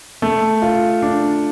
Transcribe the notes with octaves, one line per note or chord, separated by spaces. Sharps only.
A3
F4
D4